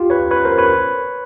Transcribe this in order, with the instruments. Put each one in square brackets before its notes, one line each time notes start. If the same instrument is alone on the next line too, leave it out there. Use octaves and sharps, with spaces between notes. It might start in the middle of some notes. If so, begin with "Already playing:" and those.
Already playing: [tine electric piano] F4 G4
B4 C#5
B4 C#5
A#4 C5
B4 C#5